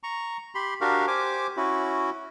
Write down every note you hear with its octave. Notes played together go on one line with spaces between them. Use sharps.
A#5 C#6
G4 B5 C6
D4 F#4 G4 A#4 F5
G4 C5 G#5 D6
C#4 E4 F#4